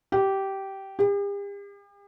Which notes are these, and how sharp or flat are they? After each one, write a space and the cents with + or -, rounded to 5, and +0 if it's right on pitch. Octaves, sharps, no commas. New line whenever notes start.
G4 -15
G4 +45